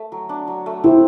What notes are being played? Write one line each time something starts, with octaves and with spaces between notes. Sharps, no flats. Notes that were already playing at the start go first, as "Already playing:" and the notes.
Already playing: A3
F#3
D4
F#3
A3
C4 E4